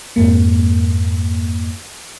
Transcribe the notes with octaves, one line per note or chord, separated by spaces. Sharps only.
F2 G#2 A#3